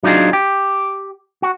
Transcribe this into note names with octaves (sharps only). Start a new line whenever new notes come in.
F#3 D4 D#4 F4 G#4
G4
F#4